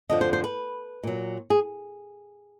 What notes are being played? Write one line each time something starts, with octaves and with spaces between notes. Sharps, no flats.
F2 D3 F3 D#5
C5
C5
B4
A#2 F#3
G#4